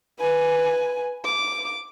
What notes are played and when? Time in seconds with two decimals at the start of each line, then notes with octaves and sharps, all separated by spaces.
0.20 B4 G#5
1.25 D6